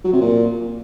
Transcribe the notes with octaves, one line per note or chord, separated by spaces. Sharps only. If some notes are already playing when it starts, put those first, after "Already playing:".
F#3
C3
A#2